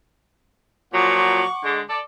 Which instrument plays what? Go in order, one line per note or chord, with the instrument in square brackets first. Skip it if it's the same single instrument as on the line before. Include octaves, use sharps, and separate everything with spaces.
[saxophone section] A#2 F3 F#3 [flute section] F#5 C#6 D6
[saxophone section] D3 G#3
A4 D5